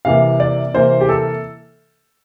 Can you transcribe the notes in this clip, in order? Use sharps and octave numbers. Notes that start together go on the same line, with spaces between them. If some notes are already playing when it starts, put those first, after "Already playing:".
C3 E3 A#3 F5
D5
C3 E3 A#3 C5
G4
A4